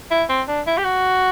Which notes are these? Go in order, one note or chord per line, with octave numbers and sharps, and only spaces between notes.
E4
C4
D4
E4
G4
F#4